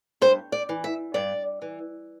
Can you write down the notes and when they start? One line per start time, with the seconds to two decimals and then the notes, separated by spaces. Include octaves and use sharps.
0.21 G2 C5
0.52 D5
0.69 E3
0.84 E5
1.14 G2 D5
1.62 E3